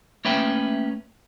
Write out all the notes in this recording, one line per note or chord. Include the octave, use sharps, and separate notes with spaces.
A3 A#3 C#4 B4 E5 G5